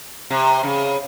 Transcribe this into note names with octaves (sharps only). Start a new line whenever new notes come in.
C3
C#3